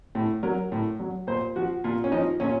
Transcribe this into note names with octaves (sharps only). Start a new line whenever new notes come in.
A2
F#3 A#4
A2
F#3
A#2 C5
F3 F#4
A#2 F4
C#4
F3 D#4
A#2 C#4